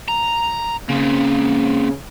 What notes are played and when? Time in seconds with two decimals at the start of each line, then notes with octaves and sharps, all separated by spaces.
0.08 A#5
0.89 C#3 A#3 C4